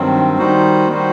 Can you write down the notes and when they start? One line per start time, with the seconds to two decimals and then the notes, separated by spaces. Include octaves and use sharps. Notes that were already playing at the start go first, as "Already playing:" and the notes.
Already playing: G2 D#3 F#3 C4
0.38 D#3 G3 D#4 F#4 C5
0.90 D#3 G3 D#4 F#4 C5